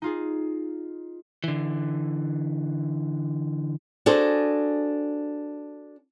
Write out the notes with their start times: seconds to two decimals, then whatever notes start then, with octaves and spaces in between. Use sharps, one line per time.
0.02 D#4 F4 G#4
1.44 D3 E3
4.06 D4 F#4 G#4 A4 C5